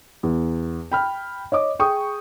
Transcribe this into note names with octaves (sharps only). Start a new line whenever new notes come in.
E2
G5 B5 F6
C#5 D#5 D6
G#4 G5 C#6 D#6